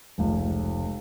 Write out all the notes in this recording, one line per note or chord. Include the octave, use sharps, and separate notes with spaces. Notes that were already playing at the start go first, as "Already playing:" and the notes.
F1 C#2